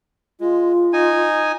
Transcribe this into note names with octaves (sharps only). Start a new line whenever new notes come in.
G#3 F4
D#4 G#5